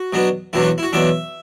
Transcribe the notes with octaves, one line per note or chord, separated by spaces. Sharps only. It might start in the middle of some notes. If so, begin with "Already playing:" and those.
Already playing: F#4
B2 F#3 B3 D4
E2 B2 F#3 D4 E4
F#4
E4
F#4
E2 B2 F#3 D4 E5